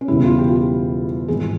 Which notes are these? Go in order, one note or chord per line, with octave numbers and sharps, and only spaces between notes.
C#4
E1 E2 C#3 G3 E4
F4
G4
F4
G4
G#1 G#2 E3 G3 G#4